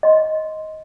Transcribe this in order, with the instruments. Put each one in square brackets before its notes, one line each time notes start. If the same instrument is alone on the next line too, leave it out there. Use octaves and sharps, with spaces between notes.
[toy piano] D#5 C6